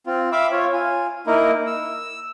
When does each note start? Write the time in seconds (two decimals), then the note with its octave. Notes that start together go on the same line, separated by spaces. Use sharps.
0.07 C4 F4
0.32 E5 F5 B5 D6 E6
0.52 F4 C#5
0.73 F4 G#5
1.27 A#3 D#4 E4 A#4
1.67 E6